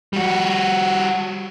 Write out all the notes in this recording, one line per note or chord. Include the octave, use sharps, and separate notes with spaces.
G3 F#4